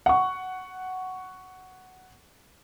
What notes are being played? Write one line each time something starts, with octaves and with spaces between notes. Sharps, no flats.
F#5 C#6